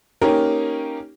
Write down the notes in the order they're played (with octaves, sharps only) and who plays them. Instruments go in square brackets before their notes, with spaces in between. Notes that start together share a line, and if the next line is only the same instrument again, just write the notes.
[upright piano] A#3 C#4 D#4 G4 A#4